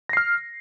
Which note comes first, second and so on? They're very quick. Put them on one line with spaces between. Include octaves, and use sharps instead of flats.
A#6 C7 F6